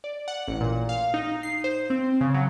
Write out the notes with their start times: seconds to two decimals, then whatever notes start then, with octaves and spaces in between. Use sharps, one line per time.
0.04 D5
0.28 F#5
0.48 A1
0.61 A#2
0.89 F5
1.14 D#4
1.43 C7
1.64 C5
1.90 C4
2.21 C#3
2.34 F#3